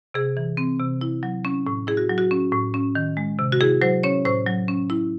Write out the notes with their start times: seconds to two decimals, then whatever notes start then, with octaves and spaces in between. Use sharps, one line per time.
0.14 C3 G#4
0.37 E3
0.57 C4
0.79 C3
1.01 E4
1.23 F#3
1.45 C#4
1.67 A2
1.87 E4 G#4
1.97 F#4
2.09 F#3
2.18 F#4
2.31 C#4
2.52 A2
2.74 C#4
2.95 D#3
3.17 G#3
3.39 C3
3.52 F#4
3.60 E4 G#4
3.81 F#3 C5
4.03 C#4 C#5
4.25 A2 C5
4.47 F#3
4.68 C#4
4.90 E4